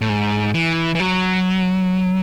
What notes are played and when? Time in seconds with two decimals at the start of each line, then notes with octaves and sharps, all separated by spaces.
0.01 A2
0.09 G#2
0.55 E3
0.95 E3
1.00 F#3